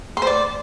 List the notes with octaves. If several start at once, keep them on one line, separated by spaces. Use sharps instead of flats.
C6
C5
D5